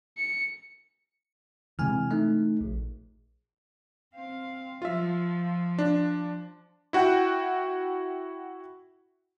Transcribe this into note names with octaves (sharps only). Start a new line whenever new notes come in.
C#7
C3 E3 G#3 G#5 F6
A3 D#4
A#1
C4 F5
F3 F4 E5
D4
E4 F#4 F#5 G5